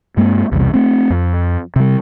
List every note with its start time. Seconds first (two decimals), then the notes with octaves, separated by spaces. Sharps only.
0.17 G2 G#3 A#3 C4
0.52 B1 E2 C3 G3
0.74 A3 C4
1.10 F2
1.76 C3 G3